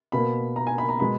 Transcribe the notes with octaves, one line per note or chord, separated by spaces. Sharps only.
B2 A#3 B5
A#5
G#5
B5
A#5
B2 G#3 B5